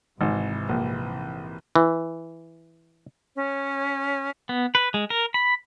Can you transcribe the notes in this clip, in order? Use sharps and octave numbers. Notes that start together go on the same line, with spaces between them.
G#1 G#2 C3 E3
A#1
E3
C#4 C#5
B3
B4
G#3
A#4
B5